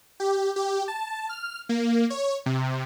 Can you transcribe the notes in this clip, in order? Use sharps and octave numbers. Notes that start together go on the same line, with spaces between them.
G4
G4
A5
F6
A#3
C#5
C3